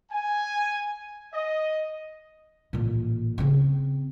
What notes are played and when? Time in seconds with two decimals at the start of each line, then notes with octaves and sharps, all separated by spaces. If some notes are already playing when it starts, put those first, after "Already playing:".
0.12 G#5
1.33 D#5
2.73 A1 A#2
3.38 C#3 C4